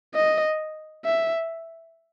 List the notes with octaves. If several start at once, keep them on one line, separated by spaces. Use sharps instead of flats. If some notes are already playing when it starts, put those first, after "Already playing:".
D#5
E5